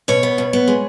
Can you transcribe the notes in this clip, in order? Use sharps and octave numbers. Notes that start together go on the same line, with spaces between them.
B2 C#5
B3
B2
B3
G#3